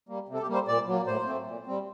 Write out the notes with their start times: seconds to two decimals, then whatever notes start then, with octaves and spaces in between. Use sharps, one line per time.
0.09 G3 A#3
0.29 C3
0.34 A4
0.42 G4
0.48 G3 A#3
0.54 C5
0.68 A#2 D5
0.87 F#3 A#3
1.07 A2 C5
1.26 A3 C4
1.47 A#2
1.66 G3 C4